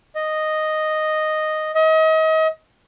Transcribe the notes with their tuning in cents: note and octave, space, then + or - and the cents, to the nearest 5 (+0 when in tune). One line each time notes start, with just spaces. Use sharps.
D#5 -5
D#5 +35